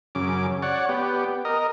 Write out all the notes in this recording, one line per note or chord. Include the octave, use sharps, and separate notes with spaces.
F#2 C#3 D6
C#5 D5 F#5
B3 G4
A#4 D#5